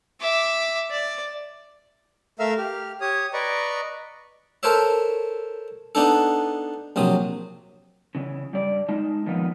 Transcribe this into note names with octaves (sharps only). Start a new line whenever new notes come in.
E5 D6
D5
A3 A#4 E5 F5 E6 F6
G4 F6
G4 C#5 D#6
B4 D5 D#5 A#5 C#6
A4 A#4 C5 C#5 E5
B3 D4 D#4 A4
A#1 C3 F#3 D#6
C#3 E3
G2 D5
G#3 D#4 A5
A#2 D#3 F3 B3 D#4